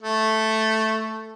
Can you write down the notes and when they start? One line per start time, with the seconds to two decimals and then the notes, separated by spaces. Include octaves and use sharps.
0.01 A3